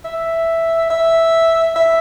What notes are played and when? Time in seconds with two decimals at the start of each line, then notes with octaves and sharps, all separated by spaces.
0.05 E5
0.90 E5
1.76 E5